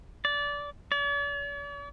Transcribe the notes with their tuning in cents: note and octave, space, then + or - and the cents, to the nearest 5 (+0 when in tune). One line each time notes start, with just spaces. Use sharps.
D5 -20
D5 -45